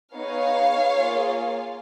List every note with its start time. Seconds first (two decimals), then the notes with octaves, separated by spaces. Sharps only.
0.15 B3 D#4 G#4 C#5 F5
0.94 A#3 F4 G#4